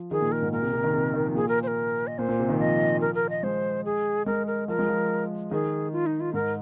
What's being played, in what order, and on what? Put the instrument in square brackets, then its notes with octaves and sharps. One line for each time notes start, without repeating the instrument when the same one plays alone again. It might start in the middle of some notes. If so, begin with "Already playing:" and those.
Already playing: [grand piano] F3
[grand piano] D#3 [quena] G#4
[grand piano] A#2
[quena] A#4
[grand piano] G#2
[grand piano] A#2 [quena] A#4
[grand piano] C3
C3
D#3
C3
D#3
F3
[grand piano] A#2 [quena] G#4
[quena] A#4
C5
A#4
D#5
[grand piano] A#2 [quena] C5
[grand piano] A#2
C3
D#3
[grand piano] F3 [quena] D#5
[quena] A#4
A#4
D#5
[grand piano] G#3 [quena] C5
[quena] G#4
[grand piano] G#3 [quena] A#4
[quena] A#4
[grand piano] F3 [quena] A#4
[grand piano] G#3
F3
[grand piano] D#3 [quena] G#4
[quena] F4
D#4
F4
[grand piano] G#2 [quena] A#4